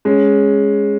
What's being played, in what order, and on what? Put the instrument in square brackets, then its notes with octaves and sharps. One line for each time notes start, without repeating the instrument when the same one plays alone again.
[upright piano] G#3 C#4